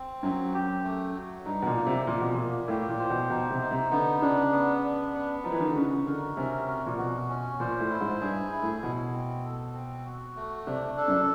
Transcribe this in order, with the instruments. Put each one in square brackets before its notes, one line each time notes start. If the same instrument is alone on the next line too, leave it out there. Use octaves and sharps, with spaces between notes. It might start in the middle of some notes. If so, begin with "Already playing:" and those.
Already playing: [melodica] C4
[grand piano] F#2 [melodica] F#3
[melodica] G4
A3
F#3
[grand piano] G2 [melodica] D#4
[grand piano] B2
A#2
[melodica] A#3
[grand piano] C3
[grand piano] A#2 [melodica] A#3
[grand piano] B2
[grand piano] A#2 [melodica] A#3
[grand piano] A2 [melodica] G4
[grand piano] A#2
[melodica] C5
[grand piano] B2
[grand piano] B2 [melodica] D#4
[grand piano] C3
[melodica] D#4
[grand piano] C3
[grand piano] D3 [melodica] B3
[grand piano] C#3 [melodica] D4
[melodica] B3
D4
B3
[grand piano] F3 [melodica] D#4
[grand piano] E3
D#3
D3
[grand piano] C#3 [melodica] F#4
[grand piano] D3 [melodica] A#4
[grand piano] C3 [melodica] C#4
[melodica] F#4
[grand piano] A#2
[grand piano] B2 [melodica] F#4
[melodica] C#4
[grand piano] A#2 [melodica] C5
[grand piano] A2
[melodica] E4
[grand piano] G#2
[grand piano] G2 [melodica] G#4
[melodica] E4
[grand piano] A2
[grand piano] B2 [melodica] E4
[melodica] C4
A4
C4
F#4
A3
[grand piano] C3 [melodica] D4
[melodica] A4
[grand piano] F#2